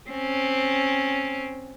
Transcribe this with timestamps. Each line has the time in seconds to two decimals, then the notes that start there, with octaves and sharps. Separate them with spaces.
0.10 C4 C#4